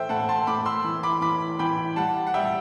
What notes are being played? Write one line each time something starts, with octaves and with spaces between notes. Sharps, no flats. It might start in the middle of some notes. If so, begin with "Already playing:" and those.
Already playing: E3 A3 C5 E5 G5
A2 F#5 A5
A5 C6
A2 B5 D6
C6 E6
E3
B5 D6
E3 B5 D6
E3 G5 B5
G3 F#5 A5
F#5
G3 E5 G5